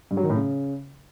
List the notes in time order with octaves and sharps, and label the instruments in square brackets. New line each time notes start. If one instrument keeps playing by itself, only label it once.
[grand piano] G2
F#3
D#3
A2
C#3